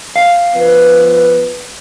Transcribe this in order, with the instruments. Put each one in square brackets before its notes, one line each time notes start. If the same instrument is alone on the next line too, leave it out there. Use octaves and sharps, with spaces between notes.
[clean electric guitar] F5
[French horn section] F3 B3 B4